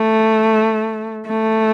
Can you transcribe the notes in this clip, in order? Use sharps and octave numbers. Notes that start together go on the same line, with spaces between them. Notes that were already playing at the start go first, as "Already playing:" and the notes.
Already playing: A3
A3